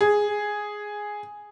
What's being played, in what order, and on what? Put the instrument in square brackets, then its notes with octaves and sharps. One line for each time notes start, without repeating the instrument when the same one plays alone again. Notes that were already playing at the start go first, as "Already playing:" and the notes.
[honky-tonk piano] G#4